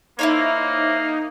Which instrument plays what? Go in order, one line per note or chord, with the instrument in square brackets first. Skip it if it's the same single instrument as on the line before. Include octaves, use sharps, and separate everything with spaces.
[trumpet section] A#3 [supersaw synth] D#4 [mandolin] E4 C5 C#5